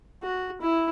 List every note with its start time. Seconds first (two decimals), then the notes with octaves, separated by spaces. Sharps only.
0.23 F#4
0.62 E4